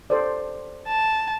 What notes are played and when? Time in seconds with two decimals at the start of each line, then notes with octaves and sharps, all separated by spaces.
0.10 A4 C5 D5
0.88 A5